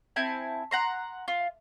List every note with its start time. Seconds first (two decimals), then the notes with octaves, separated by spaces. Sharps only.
0.16 C4 E4 G#5 A5
0.71 F#5 A#5 C6
1.28 F4